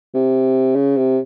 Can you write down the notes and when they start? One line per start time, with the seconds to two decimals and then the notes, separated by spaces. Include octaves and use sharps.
0.14 C3
0.76 C#3
0.97 C3